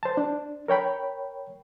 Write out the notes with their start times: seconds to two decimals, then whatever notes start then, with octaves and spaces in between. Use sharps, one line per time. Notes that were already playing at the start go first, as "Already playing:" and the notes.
0.03 C5 A5
0.17 D4
0.68 A#4 C#5 G5 B5